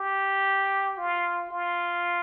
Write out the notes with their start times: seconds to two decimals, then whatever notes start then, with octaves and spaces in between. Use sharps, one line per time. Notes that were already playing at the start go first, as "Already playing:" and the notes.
Already playing: G4
0.97 F4
1.51 F4